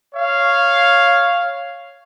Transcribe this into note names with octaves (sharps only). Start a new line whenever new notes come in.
C#5 F5